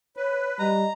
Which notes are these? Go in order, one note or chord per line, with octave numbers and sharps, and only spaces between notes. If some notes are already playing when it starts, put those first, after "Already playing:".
B4 C#5
G3 D#5 A#5